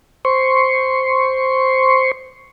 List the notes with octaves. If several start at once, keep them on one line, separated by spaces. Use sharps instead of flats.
C5 C6 C#6